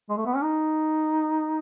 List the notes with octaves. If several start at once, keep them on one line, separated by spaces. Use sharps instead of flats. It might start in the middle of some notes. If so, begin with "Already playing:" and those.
G#3
A3
B3
C#4
D#4